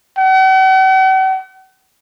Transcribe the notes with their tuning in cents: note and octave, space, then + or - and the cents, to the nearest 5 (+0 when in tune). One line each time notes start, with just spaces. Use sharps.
F#5 +45